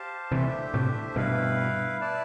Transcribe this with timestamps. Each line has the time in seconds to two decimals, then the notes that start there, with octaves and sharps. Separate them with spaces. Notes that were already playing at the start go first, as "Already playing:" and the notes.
Already playing: G4 C5 F5 A5
0.32 C3 E3 A3 D4 G4 C5 E5
0.74 A2 C3
1.16 G2 B2 E4 B4 F5
2.01 E4 B4 D5 A5